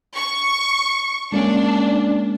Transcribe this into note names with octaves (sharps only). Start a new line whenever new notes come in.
C#6
G#3 A#3 C#4 D4